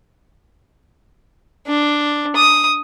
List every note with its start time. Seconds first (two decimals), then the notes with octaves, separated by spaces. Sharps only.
1.67 D4
2.36 D#6